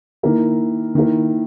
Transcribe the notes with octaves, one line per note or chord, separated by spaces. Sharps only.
D#3 A#3 E4 A#4
D#3 A#3 E4 A#4